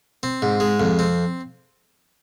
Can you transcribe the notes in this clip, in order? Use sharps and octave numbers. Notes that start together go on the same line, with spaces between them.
C4
G#2
G#3
F2
C4